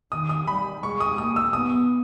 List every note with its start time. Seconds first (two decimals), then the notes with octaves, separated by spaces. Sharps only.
0.12 D#3 D#6
0.29 D#6
0.47 G3 B5
0.83 G#3 C#6
1.00 D#6
1.18 A#3 D#6
1.36 E6
1.53 B3 D#6